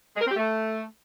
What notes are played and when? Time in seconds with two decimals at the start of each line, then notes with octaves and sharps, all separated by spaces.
0.16 G#3
0.21 A#4
0.26 C4
0.31 G4
0.36 A3